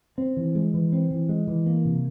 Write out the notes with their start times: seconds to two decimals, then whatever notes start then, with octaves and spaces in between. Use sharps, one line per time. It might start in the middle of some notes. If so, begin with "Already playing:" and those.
0.18 C4
0.37 E3
0.55 G#3
0.74 E3
0.92 C4
1.11 E3
1.29 G#3
1.47 E3
1.66 A#3
1.85 C3